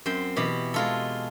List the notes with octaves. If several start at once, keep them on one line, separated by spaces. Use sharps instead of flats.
F#2 C4 C5
B2 E3 G4
G#3 F4 A4